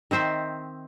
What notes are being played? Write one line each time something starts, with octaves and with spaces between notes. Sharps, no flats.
D#3 C4 C5 E5